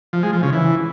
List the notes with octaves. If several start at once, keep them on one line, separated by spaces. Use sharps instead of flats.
F3
G#3
F3
C#3
E3